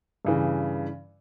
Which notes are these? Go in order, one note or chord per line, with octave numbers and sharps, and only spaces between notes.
G2 C#3 E3